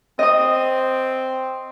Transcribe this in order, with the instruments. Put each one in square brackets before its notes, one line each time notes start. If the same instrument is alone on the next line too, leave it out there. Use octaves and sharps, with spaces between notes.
[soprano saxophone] C4 [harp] D#5 D#6